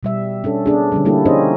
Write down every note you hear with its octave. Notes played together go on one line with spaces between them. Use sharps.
B2 G3 E5
C#4 D4 A4
B3 C#4 D4 G#4
D3 F3 G3 C#4
G3 A#3 E4 G4 A4
C#4 D#4 G#4 C5 D#5